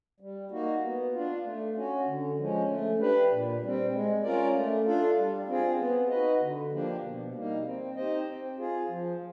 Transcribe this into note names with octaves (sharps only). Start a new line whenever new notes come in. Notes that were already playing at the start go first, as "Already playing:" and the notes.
G3
A#3 D#4 F#4
B3
D4 F4
A3
C#4 F#4
D3
F3 G#3 C#4
A3
D4 G4 B4
A#2
G3 C4
G#3
C#4 F4 A#4 D5
A3
D4 F4 A4
G3
C4 F4 G#4
B3
D#4 F#4 B4 D#5
D3
F3 A#3 D4 G4
B2
G3 A#3 D#4
C4
D#4 G4 C5 D#5
C4
F4 G#4
F3